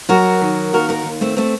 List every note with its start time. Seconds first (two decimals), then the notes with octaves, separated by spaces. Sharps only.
0.09 F#3 F#4 A#4
0.41 D#3
0.73 D#2 F#4 A#4
0.89 F#4 A#4
1.05 D#2
1.21 A3 C4
1.37 A3 C4